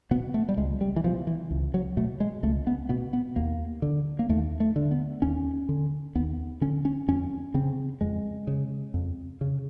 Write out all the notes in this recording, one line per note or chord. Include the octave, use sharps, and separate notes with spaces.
B2 B3
A3
G3
C#2 G#3
G3
E3
B2 F3
E3
C#2
F#3
B2 A3
G#3
C#2 A3
B3
B2 B3
B3
D#2 A#3
D3
A#3
D#2 A3
A3
D3
B3
D#2 C#4
D3
D#2 B3
D3 C#4
C#4
F2 C#4
C#3 C4
F2 G#3
C#3
F2
C#3